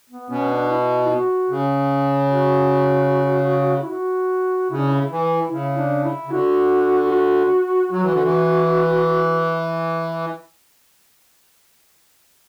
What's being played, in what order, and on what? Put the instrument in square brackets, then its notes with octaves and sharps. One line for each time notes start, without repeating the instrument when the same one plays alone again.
[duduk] B3
[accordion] B2 [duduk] C#4
[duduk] D4
E4
E4
F#4
[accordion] C#3
[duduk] F#4
E4
F#4
[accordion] C#3 [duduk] E4
[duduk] D4
E4
[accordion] E3
[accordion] C#3 [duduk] E4
[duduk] D4
E4
[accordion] C#3
[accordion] D3 [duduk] F#4
[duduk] F#4
[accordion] F#3 [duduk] F#4
[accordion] E3
D3
E3